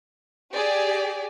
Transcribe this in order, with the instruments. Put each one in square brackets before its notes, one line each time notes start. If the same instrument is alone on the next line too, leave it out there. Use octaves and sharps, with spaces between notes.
[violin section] G4 G#4 D5